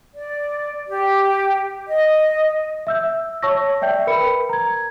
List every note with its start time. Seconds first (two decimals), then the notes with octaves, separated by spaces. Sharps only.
0.15 D5
0.88 G4
1.88 D#5
2.87 E5 E6 G6
3.42 C#5 A5 C#6 E6 A#6
3.82 D5 E5 G5 G6
4.07 A#4 B4 B5 C#7
4.49 A#5 G#6